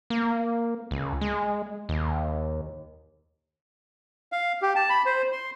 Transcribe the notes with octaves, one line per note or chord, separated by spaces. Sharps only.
A#3
C#2
G#3
D#2
F5
G4
A5
B5
C5
C6